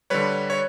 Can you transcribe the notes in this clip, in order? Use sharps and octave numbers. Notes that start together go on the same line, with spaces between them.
D3 G3 B4 C#5
C#5